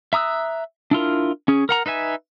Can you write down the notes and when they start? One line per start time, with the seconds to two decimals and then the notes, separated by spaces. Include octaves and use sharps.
0.13 E5 A#5 D#6 E6 F#6
0.91 D4 E4 F4 A#4
1.48 C#4 G#4
1.69 A#4 F#5 A#5
1.86 D#4 B4 E5 G#5